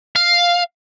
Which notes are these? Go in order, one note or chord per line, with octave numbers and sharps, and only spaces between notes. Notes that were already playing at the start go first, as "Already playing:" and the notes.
F5